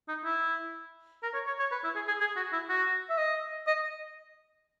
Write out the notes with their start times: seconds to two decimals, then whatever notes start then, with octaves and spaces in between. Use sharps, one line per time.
0.08 D#4
0.24 E4
1.23 A#4
1.34 C#5
1.47 C#5
1.59 C#5
1.71 B4
1.84 E4
1.96 G#4
2.08 G#4
2.20 G#4
2.36 F#4
2.53 E4
2.69 F#4
3.10 E5
3.18 D#5
3.67 D#5